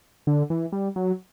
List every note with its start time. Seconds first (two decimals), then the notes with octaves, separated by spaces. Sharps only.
0.27 D3
0.50 E3
0.72 G3
0.96 F#3